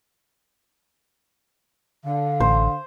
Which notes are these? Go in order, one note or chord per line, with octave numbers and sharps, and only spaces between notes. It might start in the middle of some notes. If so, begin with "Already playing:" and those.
D3 F5
A1 C5